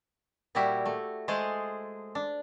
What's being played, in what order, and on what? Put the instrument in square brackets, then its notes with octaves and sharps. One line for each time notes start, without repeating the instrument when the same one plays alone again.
[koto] A#2 G3 E4 F#4 G4 E5
A3
G#3 A3 G#4 C5 A5
D4